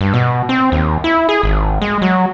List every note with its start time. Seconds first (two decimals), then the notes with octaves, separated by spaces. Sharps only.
0.01 G2
0.13 B2
0.49 C4
0.72 D#2
1.04 E4
1.29 G#4
1.43 G#1
1.82 G#3
2.02 F#3